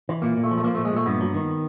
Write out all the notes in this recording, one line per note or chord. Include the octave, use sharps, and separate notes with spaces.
E3
A#2 A#3
A#2
A3
F3
A3
F3 A#3
A#2 A3
G#3
A#2 A3
G2 B3
F#3
D#3